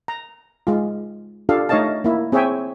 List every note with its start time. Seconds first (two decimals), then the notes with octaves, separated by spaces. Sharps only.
0.08 A#5
0.67 G#3 F4
1.49 D4 F4 G4 A4 F5
1.69 A3 D#4 C#5 D#5 F5 A5
2.04 A#3 E4
2.32 C4 G#4 C#5 E5 G5 G#5